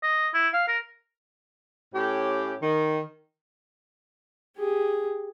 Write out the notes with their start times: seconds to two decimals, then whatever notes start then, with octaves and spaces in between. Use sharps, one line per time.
0.03 D#5
0.34 E4
0.54 F5
0.68 A#4
1.94 A2 C#4 G4
2.62 D#3
4.58 G4 G#4